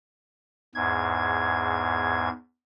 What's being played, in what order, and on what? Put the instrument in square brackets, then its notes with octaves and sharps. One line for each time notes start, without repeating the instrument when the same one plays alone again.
[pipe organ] E2 G#2 G#6